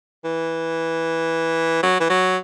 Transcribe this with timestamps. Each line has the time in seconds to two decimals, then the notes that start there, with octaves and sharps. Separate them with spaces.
0.24 E3
1.83 F#3
2.00 E3
2.09 F#3